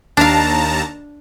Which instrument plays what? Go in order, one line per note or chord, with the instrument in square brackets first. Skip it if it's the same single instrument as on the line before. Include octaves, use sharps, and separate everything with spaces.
[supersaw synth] D#2 A5 A#5 [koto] D4 F5